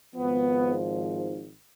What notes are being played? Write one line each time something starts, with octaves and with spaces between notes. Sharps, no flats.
G#1 G#2 F3 B3